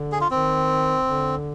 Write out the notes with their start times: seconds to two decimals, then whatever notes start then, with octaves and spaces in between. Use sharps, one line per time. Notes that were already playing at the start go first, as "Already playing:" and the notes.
Already playing: D3
0.12 G#4
0.21 F4
0.31 D#3 C4
1.06 D3